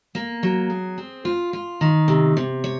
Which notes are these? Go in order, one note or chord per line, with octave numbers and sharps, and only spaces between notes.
A#3
F#3
G#4
C4
F4
F4
D#3
C3
C3
C#5